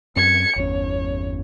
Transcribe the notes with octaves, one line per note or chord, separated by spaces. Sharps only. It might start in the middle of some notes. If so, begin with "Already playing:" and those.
F#2 C4 G#6 C#7
G1 E2 C#4 C#5